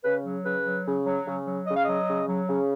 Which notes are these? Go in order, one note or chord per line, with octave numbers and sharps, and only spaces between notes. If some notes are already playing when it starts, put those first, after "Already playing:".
C#3 B4
F#3
C#3 B4
F#3
C#3
F#3
C#3
F#3
C#3 D#5
F5
F#3 D#5
C#3
F#3
C#3